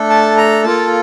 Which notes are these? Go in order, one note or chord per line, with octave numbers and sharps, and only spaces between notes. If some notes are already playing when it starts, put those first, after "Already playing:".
Already playing: A3 D4 A4
A5
A#5
A#3 F4 A4 A5